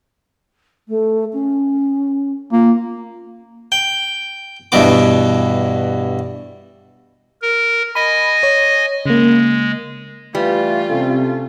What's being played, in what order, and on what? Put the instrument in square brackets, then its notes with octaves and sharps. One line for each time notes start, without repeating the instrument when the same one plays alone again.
[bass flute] A3
C#4
[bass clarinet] A#3 [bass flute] F4
[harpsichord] G5
G2 B2 E3 B3 D6
[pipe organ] A#4
[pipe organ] D#5 G#5 [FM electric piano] B5
[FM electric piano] C#5
[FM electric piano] C#3 A#3 [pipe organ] G#3
[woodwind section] E3 A3 [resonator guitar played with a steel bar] G3 [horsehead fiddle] F4
[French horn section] C3 [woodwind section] A3 C4 C#4